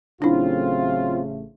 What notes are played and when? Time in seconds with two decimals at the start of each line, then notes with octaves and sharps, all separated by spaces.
0.22 A1 C#3 F#3 A3 C4 D4 E4 F4